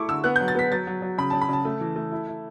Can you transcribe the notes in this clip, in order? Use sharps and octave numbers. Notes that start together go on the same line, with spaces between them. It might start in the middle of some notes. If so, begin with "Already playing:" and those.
Already playing: A3 E4 C#6 D6
D3 E6
B3 F#6
F#3 G6
A6
B3 B6
F#3 A6
F#3
F#3
C#3 B5
C#3 A5
B5
C#3 A5
A3
E3
A3
E4
E4